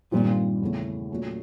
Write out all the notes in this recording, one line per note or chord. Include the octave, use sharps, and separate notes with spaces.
G2 A#2 D#3 G3 C4 F4
E2 C#3 E3 A3
A#2 F#3 A3 C#4